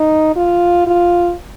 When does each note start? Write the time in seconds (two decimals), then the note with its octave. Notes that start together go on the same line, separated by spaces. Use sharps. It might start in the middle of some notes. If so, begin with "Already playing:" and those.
Already playing: D#4
0.36 F4
0.87 F4